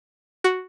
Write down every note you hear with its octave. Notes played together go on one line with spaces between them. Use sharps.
F#4